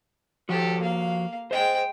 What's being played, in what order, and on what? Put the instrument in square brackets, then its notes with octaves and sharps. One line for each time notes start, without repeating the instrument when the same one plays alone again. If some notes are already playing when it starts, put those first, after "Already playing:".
[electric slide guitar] F3 F#4 [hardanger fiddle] G4 A4
[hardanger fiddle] A#3 F5
[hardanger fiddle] G#3 G5 [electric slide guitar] C5 D#5